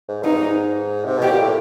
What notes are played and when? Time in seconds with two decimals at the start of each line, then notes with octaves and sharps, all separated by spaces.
0.08 G#2
0.22 G2 D#4
0.36 G#2
1.05 C3
1.18 B2 G4
1.30 A#2
1.42 A2